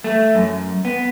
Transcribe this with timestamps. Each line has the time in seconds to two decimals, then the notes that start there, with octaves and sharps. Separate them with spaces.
0.04 A3
0.35 F#2
0.85 B3